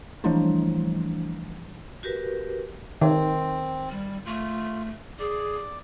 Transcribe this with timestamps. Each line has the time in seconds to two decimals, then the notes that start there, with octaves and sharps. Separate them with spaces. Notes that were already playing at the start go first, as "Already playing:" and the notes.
0.24 E3 F3 G3 A3 D4 E4
2.03 F#4 G4 A#4 B4
3.02 D#3 C4
3.90 G3
4.26 A3 F4
5.19 G#4 D5